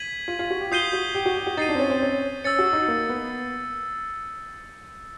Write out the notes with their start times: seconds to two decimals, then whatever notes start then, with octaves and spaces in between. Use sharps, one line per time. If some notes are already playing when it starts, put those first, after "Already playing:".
Already playing: G#6 B6 D#7 F#7
0.28 F4
0.39 F4
0.50 F#4
0.61 G4
0.71 F4 D#6 G6 C7 D#7 G7
0.93 F#4
1.15 G4
1.26 F#4
1.36 G4
1.47 F#4
1.57 D#4 A6 C7 D#7
1.69 D4
1.75 C4
1.79 C#4
1.90 C4
2.02 C#4
2.44 C#4 E6 A6 C#7
2.59 F#4
2.73 D#4
2.88 A#3
3.09 B3